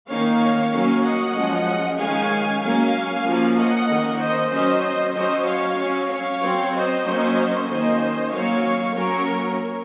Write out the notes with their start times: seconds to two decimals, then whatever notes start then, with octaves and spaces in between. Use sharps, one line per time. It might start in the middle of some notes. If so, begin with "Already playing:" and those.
0.08 D#3 A#3 C#4 C#5 F5
0.72 F#3 A#3 C#4
1.03 D#5 F#5
1.35 F3 G#3 C#4
1.98 D#3 G#3 C#4 F5 G#5
2.61 F#3 A#3 C#4 F5 G#5
3.25 F3 A#3 C#4
3.57 D#5 F#5
3.88 D#3 A#3 C#4
4.20 C5 D#5
4.51 F#3 C#4 C5 D#5
5.15 F#3 C#4 C5 D#5
5.46 C#5 F5
5.78 F#3 C#4
6.10 C#5 F5
6.42 F#3 C4
6.73 C5 D#5
7.05 F#3 A#3 C#4
7.68 D#3 A#3 C#4 C5 D#5
8.31 F#3 A#3 C#4 C#5 F5
8.94 F#3 A#3 C#4 A#4 C#5